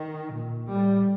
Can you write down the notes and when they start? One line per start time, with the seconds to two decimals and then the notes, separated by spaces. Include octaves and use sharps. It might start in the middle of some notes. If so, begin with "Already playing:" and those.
Already playing: D#3
0.32 A#2
0.71 A2 G3